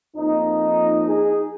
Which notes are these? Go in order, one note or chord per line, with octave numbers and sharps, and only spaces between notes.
F2 F3 A#3 D#4
D#4 G#4